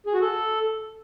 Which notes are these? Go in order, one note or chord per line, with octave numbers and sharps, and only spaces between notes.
G#4
F#4
A4